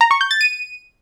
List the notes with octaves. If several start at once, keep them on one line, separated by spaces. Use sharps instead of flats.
A#5
C#6
G6
A6
D#7